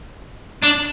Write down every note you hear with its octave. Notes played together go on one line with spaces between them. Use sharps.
D4